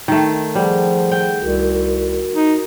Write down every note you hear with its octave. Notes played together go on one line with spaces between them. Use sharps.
D#3 A3
F3 G3 G#4 F#5
G5
C2 F#4 A#4
D#4